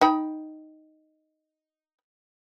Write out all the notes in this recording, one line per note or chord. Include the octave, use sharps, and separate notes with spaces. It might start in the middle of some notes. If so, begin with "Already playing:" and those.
D#4 G5 B5